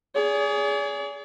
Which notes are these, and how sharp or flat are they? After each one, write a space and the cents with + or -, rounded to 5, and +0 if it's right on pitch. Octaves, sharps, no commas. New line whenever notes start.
G#4 +0 D5 -45